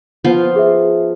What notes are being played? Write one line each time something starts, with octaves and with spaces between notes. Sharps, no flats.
F3 B3 F4
G#4 E5